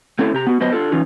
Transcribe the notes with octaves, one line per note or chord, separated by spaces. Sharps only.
A3 C4 C#4 E4 A4
C3 G4 A#5
B3 F#4
F#3 B3 B4 C5 D#5
D4 F4 A4
E3 C#4 D#4 F4